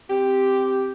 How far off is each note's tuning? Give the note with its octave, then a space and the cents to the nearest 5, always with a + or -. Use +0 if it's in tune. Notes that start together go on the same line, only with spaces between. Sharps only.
C4 +0 G4 +0